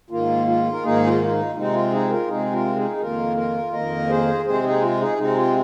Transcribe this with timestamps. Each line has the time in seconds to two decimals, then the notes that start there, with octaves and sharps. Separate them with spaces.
0.10 G#2 D#3 A#3 F4
0.47 F4
0.72 A#4
0.83 G#2 D#3 A#3 D#4 G#4
1.07 F4
1.24 F4
1.31 D#4
1.56 C3 G#3 C4 D#4
1.74 F4
1.92 D#4 G#4
2.10 F4 A#4
2.28 C3 G#3 C4 D#4 G#4
2.52 F4 A#4
2.76 D#4 G#4
2.97 G#4
3.01 F2 D#3 A#3 F4 A#4
3.37 F4 A#4
3.73 F2 D#3 A#3 A#4 D#5
4.09 G#4 C5
4.46 C3 G#3 C4 G#4 C5
4.64 D#4 G#4
4.82 F4
5.00 D#4 G#4
5.18 C3 G#3 C4 D#4
5.36 F4